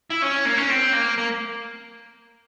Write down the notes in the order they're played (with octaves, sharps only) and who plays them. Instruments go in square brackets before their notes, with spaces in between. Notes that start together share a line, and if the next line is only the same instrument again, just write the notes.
[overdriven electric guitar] E4
C#4
A#3
C#4
C4
A#3
A#3